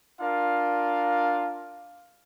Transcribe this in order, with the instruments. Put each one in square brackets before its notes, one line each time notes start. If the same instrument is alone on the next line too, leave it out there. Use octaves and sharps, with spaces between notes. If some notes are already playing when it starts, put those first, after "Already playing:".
[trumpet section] D4 F4 A#4 F5